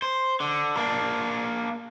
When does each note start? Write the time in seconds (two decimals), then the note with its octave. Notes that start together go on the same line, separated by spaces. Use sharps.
0.02 C5
0.40 D3
0.77 A#3 D4